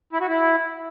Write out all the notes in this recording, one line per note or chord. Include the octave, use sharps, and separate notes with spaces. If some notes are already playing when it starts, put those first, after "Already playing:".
E4
F#4
E4